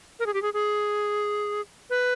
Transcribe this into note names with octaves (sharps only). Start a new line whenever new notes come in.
A#4
G#4
G4
G#4
G#4
B4